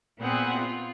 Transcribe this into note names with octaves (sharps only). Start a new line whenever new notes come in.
A#2 B3 C4 G#4 F#5
F4